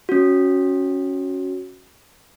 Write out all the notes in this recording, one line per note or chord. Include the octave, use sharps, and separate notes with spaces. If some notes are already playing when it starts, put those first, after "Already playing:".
C#4 F#4